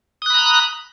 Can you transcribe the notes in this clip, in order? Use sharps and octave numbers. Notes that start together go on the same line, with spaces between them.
A#5 B5 D#6 F#6